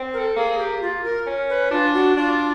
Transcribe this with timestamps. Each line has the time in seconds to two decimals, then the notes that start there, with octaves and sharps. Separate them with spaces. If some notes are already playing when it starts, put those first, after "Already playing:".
Already playing: C4
0.13 A#4
0.18 A4
0.36 A#3 G#4
0.58 G4
0.82 F4
1.04 A#4
1.27 C#4
1.50 B4
1.71 D4 F4
1.94 F#4
2.17 D4 F4